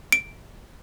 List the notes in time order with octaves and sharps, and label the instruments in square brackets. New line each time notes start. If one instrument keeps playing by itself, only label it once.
[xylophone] D7